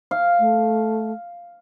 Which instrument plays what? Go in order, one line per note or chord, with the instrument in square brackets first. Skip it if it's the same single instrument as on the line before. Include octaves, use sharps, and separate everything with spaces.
[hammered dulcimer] F5
[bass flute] A3